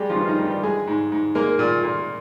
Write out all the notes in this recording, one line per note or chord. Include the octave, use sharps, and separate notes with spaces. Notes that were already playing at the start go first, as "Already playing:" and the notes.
Already playing: G3 G#3 G4
F3 F4
G2
D#3 D#4
G2
G3 G4
G#3 G#4
G#2
G#2
G#3 A#3 A#4
A#2
A#2